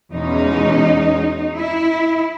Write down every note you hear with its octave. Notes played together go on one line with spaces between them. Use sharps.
E2 B2 G#3 C#4 D#4
E4